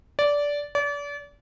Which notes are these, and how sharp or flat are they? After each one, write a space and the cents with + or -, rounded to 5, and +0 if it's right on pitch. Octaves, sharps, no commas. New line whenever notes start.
D5 -15
D5 -35